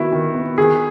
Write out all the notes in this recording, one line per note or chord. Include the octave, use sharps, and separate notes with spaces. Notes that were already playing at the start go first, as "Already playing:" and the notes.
Already playing: D#3 A#3 B3 E4 F#4
D#3
B3
D#3 G#4